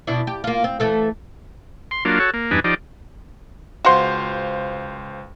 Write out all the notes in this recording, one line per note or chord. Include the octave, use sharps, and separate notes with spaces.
B2 D4 E4
G4
A#3 F4
C4
E3 A3 A4
C6
F#3 A#3 D4 F4
F#4 A4 C#5
A#3
E2 G2 D4 D#4 B4 G#5
F3 D#4 G4 D5
C#2 F#4 C5 F5 C6